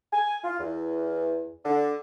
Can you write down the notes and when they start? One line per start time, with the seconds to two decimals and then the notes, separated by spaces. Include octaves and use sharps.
0.13 G#5
0.43 F4
0.60 E2
1.65 D3